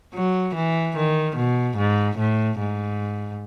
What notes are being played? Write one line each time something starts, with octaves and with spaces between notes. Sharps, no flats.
F#3
E3
D#3
B2
G#2
A2
G#2